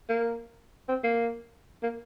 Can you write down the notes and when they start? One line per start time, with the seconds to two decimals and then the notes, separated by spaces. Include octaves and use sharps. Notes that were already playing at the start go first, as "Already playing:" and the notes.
0.09 A#3
0.89 C4
1.04 A#3
1.83 A#3